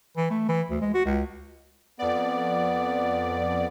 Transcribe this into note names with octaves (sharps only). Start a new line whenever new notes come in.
E3
A3
E3
D2
G#3
F#4
C#2
F2 B3 D5